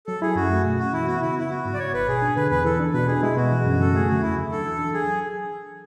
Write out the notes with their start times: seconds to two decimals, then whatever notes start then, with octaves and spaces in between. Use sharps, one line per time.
0.07 F#3 A4
0.22 E4 G#4
0.35 F#2 F#4
0.51 A3
0.64 B2
0.79 C#4 F#4
0.93 E3 E4
1.07 B3 F#4
1.21 C#3 E4
1.36 B3 E4
1.50 F#3 F#4
1.65 G#2
1.74 D5
1.79 G#2 C#5
1.93 G#1 B4
2.08 B2 G#4
2.22 D4
2.36 D3 B4
2.51 E2 B4
2.65 E3 A4
2.79 D4
2.94 B2 B4
3.08 D4 G#4
3.23 G#3 E4
3.37 B2 F#4
3.52 E3
3.65 F#2
3.80 C#3 A4
3.94 A3 G#4
4.08 D3 F#4
4.22 E2 E4
4.37 F#3
4.51 D4 A4
4.66 E3
4.79 D4
4.93 F#3 G#4